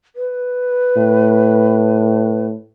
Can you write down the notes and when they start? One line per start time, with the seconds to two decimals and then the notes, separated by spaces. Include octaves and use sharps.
0.16 B4
0.97 A2